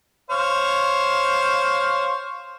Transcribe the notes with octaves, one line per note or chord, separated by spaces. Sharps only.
C5 C#5 F5